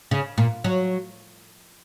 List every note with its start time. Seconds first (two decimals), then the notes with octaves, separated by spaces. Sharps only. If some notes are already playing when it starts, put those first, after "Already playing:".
0.11 C#3
0.38 A#2
0.64 F#3